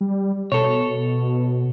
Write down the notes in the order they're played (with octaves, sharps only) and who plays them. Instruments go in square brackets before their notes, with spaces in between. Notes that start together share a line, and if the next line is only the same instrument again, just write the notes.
[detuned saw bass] G3
[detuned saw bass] B2 [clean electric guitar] A4 C#5